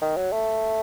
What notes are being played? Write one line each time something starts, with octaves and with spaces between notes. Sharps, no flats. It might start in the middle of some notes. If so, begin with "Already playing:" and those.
D#3
F#3
A3